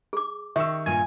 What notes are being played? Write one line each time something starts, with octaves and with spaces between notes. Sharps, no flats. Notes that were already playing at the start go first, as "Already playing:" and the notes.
G#4 D6
D#3 G4 E5 C#6 E6
G2 A#2 G#5